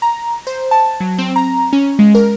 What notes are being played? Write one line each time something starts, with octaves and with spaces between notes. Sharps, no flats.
A#5
C5
A5
F#3
C4
A#5
C#4
G#3
A#4